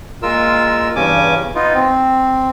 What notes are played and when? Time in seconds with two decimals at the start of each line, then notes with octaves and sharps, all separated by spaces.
0.23 A#2 G#3 F4 A#4 E6
0.96 E2 G2 C#3 C#4 G#5 D6
1.55 B3 D#4 F4
1.74 C4